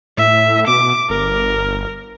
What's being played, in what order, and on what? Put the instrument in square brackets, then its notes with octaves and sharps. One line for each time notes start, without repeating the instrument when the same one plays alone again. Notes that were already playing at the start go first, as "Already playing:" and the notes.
[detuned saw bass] A2 [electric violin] E5
[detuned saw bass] B2 [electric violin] D6
[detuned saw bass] G1 [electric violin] A#4